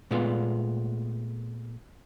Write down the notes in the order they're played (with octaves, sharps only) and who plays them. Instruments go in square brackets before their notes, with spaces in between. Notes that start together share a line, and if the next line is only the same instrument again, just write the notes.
[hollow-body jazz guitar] A#2 G#3 A3 B3 F4